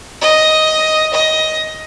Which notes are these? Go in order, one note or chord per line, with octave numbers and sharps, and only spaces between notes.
D#5
D#5